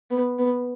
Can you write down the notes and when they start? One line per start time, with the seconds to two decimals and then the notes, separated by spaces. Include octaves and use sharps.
0.10 B3
0.39 B3